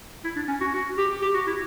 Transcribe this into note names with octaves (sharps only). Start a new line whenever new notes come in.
E4
D4
C#4
F#4
F#4
G4
G4
F#4
E4